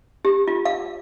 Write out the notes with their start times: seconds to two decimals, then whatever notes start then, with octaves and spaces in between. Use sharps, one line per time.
0.25 G4
0.47 F4
0.65 F5